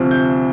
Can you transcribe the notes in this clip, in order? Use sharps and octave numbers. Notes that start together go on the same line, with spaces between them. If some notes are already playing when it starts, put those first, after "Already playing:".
Already playing: D2 C3 F3 C4
G6